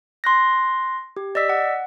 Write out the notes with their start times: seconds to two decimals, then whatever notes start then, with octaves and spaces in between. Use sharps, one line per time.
0.24 C6 F#6 A#6
1.17 G4
1.35 D5 D#5 E6 B6
1.49 F#5